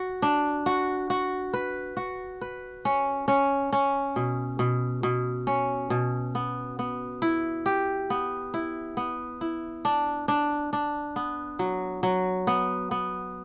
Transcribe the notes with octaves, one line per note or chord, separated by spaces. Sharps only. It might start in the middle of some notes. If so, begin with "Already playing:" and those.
Already playing: F#4
D4
F#4
F#4
B4
F#4
B4
C#4
C#4
C#4
B2
B2
B2
C#4
B2
B3
B3
E4
G4
B3
E4
B3
E4
D4
D4
D4
B3
F#3
F#3
B3
B3